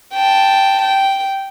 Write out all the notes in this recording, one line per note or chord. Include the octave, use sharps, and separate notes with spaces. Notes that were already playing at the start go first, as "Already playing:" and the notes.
G5 A5
G5